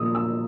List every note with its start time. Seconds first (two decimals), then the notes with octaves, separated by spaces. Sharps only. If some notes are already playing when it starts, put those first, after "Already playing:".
Already playing: A#2 F3 G#3 D#6 E6
0.15 E6